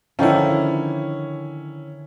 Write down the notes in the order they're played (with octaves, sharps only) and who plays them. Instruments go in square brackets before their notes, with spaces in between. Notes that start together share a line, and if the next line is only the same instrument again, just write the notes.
[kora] D3 D#3 F3 [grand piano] C#4 E4